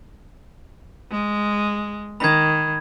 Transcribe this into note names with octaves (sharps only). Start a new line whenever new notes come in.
G#3
D#3 B5 G#6